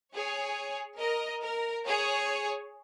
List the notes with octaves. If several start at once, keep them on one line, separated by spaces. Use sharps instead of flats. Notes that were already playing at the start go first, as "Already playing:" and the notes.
G#4 C#5
A#4 D#5
A#4
G#4 C#5